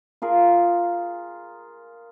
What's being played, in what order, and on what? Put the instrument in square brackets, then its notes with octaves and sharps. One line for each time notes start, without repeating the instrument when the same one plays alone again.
[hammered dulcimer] F4 G#4 A#4